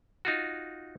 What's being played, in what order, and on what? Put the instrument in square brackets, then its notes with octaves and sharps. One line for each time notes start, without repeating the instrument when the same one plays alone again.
[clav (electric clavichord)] D#4 F4 F#4